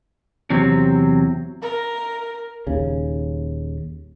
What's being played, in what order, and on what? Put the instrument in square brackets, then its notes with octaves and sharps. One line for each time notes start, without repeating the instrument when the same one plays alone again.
[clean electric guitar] E2 C3 F#3 C4
[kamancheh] A#4
[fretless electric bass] D#1 D#2 C#3